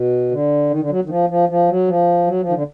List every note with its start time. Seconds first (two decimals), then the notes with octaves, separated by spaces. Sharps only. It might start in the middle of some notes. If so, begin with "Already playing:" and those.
Already playing: B2
0.31 D3
0.70 D#3
0.80 D3
0.90 F#3
1.05 D#3
1.10 F3
1.30 F3
1.49 F3
1.69 F#3
1.88 F3
2.27 F#3
2.41 F3
2.49 D#3
2.53 D3